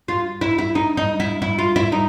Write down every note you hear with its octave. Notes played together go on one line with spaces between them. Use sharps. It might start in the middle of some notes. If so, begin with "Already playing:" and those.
F4
E4
E4
D#4
D#4
E4
E4
F4
E4
D#4